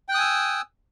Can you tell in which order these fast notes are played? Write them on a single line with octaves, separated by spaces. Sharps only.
G5 F#6 D#6 G#5 E6